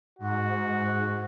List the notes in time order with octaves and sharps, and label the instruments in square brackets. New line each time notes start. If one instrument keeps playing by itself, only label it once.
[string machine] G#2 [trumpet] F#4